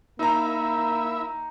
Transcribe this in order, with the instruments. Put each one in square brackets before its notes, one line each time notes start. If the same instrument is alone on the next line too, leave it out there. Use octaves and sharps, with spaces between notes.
[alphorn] A#3 [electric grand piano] D#4 A#5 [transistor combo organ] E4 E5 B5